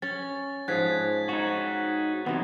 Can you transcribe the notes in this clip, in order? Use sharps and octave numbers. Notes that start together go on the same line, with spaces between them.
C#4 C#5 A6
G#2 F3 G#4 F#6 G#6 B6
D#4 F#4 C#5
E2 C3 F#3 B3 D#4